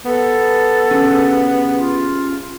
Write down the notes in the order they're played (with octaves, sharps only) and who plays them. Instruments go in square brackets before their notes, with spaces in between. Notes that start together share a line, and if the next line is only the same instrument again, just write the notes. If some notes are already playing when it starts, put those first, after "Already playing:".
[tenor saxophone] B3 [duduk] A4
[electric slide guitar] C#4 G4 G#4
[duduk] F4